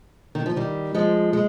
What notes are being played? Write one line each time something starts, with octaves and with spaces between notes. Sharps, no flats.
D#3
F3
D#3 G3
F3 G#3
G#3